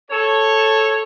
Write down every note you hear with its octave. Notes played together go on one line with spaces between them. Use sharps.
A4 C#5